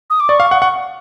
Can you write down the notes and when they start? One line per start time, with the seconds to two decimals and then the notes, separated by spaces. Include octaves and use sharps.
0.10 D#6
0.20 D6
0.29 D5 C#6
0.40 F5
0.51 F#5
0.62 F#5